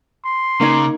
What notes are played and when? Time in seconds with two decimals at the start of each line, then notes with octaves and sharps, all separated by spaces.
0.24 C6
0.61 C#3 A#3 D#4 C#5 A#5 D6